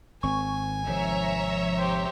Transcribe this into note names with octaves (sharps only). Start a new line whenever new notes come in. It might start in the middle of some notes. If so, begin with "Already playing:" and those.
G#1 C4 G#5 C#6
G#1 C3 D#3 F3 C#5 E5 A#5
G4 C5